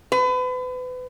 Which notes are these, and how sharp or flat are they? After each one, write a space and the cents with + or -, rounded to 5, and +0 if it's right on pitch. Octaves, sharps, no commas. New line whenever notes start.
B4 +35